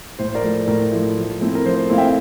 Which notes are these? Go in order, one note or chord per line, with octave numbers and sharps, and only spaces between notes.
A2 C5
A#4 D5
F3 A3 E4
A2 A#4
F3 A3 E4
F3
A3 C4 E4
A#4
F3 C5
A3 C4 E4 F5
E5 G5